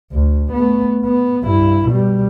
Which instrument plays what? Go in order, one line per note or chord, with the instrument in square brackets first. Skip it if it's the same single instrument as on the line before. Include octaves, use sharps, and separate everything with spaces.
[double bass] D2
A3 B3
B3
G2 E4
B2 G3